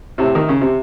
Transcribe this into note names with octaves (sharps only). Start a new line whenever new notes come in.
A2 C3
D#3
C#3
C3